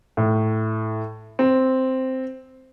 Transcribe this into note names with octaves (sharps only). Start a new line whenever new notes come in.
A2
C4